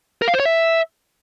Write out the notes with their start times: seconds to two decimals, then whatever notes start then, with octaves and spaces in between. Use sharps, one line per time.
0.22 A#4
0.28 F5
0.34 C5
0.40 C#5
0.46 E5